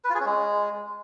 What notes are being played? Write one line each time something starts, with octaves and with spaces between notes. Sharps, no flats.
B4
F4
G#4
C#4
G#3